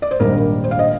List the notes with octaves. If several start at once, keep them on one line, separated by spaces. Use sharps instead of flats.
D5
C5
A#1 G#2 D#3 G3 D4 A#4
C5
F5
D#5